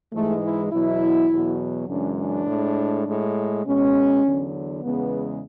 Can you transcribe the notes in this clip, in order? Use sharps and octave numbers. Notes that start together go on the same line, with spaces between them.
G#2 E3 G#3 A3
E4
E2 B2 F#3 E4
E2 B2 F#3
F#2 C#3 E3 G#3 D4
D4
A2 G#3
A2 G#3
B2 G#3 C#4
E2 D3 F#3
E2 C#3 G#3 B3